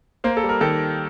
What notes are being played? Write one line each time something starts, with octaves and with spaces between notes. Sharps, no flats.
A#3 C5
A4
G3
A#4
D#3 A4